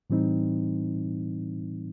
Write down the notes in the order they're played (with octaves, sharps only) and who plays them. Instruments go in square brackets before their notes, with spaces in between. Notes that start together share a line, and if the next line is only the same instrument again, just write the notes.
[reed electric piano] A2 E3 G3 C4 D#4